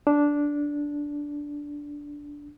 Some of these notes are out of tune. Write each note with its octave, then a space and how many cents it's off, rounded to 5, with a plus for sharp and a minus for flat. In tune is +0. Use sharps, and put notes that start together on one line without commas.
D4 -10